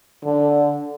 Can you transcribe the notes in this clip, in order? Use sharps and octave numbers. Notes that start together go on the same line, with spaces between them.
D3